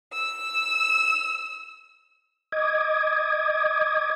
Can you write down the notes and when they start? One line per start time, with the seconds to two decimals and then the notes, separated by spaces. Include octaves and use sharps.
0.13 E6
2.52 D#5 D6 D#6 G#6